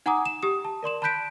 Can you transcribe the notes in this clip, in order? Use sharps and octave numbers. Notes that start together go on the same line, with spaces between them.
D#4 F#5 G#5 A#5 D6 D#6
E7
G4 D#6
A5
A#4 D5 C6 E7
A5 B5 F#6 G6 B6 D7